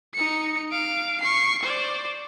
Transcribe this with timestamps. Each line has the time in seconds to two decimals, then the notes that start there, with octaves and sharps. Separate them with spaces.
0.14 D#4 C#7
0.72 F5 D7
1.21 C#6 C7
1.63 C5 D5